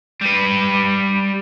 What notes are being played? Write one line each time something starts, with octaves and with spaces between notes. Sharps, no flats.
G3 B4